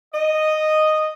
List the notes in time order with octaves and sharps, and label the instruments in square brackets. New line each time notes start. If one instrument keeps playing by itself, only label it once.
[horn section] D#5